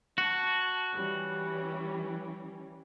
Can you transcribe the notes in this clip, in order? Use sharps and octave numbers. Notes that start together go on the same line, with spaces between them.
F#4 A5 C#6
E3 G3 C#4